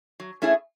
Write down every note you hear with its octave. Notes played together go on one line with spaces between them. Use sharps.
F#3
A3 C#4 E4 G#4